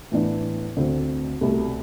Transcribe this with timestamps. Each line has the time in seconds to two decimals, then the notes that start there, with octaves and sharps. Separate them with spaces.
0.12 A2 E3 B3 D4
0.77 D2 D3 A3 C4
1.41 C2 B2 A3